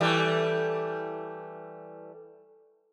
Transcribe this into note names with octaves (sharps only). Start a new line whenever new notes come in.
E3 G3 A3